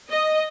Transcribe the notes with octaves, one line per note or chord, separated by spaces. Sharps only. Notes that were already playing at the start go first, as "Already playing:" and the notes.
D#5